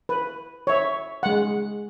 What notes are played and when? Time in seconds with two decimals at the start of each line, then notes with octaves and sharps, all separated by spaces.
0.09 B4
0.67 C#5 E5
1.23 G#3 F#5